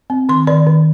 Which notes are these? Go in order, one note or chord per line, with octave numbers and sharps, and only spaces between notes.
C4
D#3 C6
D#3 D5
D#3